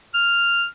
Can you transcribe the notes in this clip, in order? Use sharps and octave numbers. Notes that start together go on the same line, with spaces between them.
F6